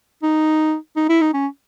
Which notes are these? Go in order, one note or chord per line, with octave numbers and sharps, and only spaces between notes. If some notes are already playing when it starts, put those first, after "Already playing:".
D#4
D#4
E4
D#4
C#4